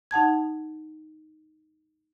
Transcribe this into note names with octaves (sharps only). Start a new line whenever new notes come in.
D#4 F#5 A5 G#6